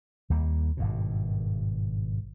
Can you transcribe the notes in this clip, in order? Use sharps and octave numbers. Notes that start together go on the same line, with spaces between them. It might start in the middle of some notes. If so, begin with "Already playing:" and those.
D#2 G3 A#3
G#1 G2 B2